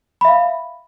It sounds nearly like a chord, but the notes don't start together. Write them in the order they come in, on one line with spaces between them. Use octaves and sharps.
B5 E5 F5